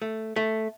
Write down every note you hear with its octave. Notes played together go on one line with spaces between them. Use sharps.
A3
A3